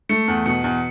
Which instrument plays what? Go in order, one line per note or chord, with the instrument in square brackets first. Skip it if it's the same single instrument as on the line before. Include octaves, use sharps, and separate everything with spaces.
[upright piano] A3 [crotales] C#7
[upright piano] E2
[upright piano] B2 [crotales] C#7
[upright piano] E2